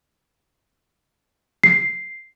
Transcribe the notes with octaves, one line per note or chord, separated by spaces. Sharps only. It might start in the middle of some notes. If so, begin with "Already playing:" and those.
C7